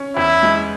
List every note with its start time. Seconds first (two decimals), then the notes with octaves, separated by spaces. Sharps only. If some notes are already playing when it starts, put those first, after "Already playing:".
Already playing: C#4
0.16 E2 E4
0.43 G#3